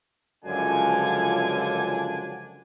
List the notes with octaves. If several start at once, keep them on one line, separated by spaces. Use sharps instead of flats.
C#2 F#2 D3 F3 D4 G#5